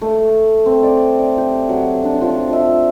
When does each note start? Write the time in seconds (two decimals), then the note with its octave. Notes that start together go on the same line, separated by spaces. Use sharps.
0.01 A3
0.66 C4
0.83 D5
1.19 D5
1.38 G4
1.69 F#3
2.04 D4
2.21 F3
2.53 E5